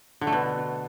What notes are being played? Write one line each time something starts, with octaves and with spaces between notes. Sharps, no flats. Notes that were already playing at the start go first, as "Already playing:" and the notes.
D3
A3
B2